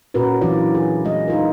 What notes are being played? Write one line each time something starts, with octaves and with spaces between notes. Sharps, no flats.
A#2 C#4 F#4 A#4 B4
E3 F#3 D4 F4 D5
G#4
G#3 D#5
D#4 F4 A#4